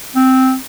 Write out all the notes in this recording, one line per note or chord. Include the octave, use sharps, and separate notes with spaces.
C4